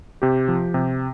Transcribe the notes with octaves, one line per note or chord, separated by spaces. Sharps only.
C3 G4
F3
C3